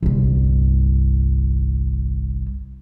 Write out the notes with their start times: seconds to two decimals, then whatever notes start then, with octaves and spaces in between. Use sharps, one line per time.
0.03 G1 C2